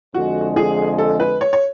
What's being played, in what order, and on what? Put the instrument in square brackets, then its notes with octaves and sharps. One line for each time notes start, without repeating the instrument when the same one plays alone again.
[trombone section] F2 D3 G#3 [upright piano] F#4
[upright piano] G#4
A4
B4
C#5
C#5